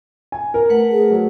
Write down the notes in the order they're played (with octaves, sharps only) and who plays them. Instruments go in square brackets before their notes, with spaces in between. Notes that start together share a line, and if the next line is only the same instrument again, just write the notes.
[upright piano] G#5
A#4
[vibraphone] A3 B4 F#5
[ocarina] G#4
[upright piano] F#3